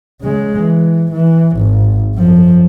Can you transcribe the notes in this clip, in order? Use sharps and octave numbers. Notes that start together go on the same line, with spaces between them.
C#3 G#3
E3
E3
G#1
F#2 F3